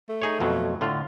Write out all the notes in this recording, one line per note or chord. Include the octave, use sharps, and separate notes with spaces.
A3
D#4 G#4 C#5
F2 B2 F#3
A2 D3 F4